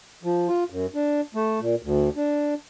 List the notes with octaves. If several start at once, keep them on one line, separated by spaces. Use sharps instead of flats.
F3
F4
F#2
D4
A3
A#2
D2
D4